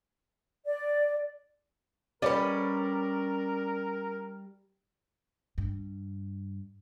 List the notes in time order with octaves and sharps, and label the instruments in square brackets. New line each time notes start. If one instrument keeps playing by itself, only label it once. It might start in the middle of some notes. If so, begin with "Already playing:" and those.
[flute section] D5
[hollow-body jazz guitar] G3 G4 D#5 [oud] C#4 B4 [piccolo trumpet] A#4 [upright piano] D5
[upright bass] G2